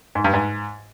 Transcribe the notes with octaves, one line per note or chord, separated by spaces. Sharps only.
G#2
G2
G#2